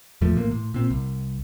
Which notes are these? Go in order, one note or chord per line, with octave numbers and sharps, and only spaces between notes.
E2 A2 F3 A3
A1 A2 A#3
A2
A#2 C4
C2